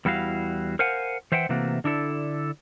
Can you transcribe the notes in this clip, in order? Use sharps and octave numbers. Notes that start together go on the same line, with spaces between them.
E2 G3 E4 F#4 F5
A#4 C5 F5 F#5 G#5
E3 C5 E5 F#5 G5
C3 E3 A3 A#3 F#4
D3 D4 E4 A4